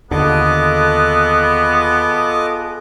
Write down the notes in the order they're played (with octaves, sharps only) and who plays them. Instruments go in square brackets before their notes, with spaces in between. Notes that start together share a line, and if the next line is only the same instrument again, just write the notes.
[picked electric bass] D#2 D3 [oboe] B3 [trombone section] F4 G#4 A4 [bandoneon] D#5 D6